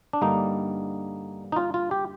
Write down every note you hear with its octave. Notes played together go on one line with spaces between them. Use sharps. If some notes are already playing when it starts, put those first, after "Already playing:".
D4
G2 D3 G3 A#3 D#4
D#4
F4
F4
G4